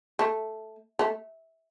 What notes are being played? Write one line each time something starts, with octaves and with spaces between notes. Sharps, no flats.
A3
A3